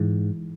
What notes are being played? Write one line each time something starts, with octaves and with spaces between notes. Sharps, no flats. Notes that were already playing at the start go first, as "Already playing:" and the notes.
Already playing: G#2 E3